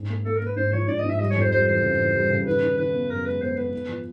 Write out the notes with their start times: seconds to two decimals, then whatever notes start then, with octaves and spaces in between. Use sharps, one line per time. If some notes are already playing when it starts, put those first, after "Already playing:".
Already playing: G#2
0.09 A#3
0.25 A#3 A4
0.36 A#4
0.41 A#3 B4
0.56 G#2 C5
0.73 F3 C#5
0.88 G#2 D5
0.99 D#5
1.05 G#2
1.10 E5
1.20 G3 D#5
1.30 C#5
1.36 F2
1.41 C5
1.52 G3 C5
1.68 E3 C5
1.83 C#3
1.99 E3
2.15 G3
2.30 C#3
2.46 D#3 B4
2.62 D#3
2.78 D#3 B4
2.94 B3
3.10 F#2 A#4
3.25 G#3 B4
3.41 B3 C5
3.57 B3 B4
3.73 B3
3.89 F3